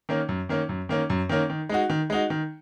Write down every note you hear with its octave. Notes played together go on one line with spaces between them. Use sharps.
D#3 A#3 C#4
F#2
D#3 A#3 C#4
F#2
D#3 A#3 C#4
F#2
D#3 A#3 C#4
D#3
G#3 D#4 F#4
D#3
G#3 D#4 F#4
D#3